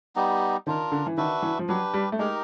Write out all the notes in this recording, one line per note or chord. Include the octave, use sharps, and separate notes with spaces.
G3 B3 D#4 G4
D#3 D4 F4 A#4
D3
E3
D#3 D4 F#4 B4 E5
E3
F3
F#3 D4 G4 B4
G3
A3
G#3 D#4 G4 A#4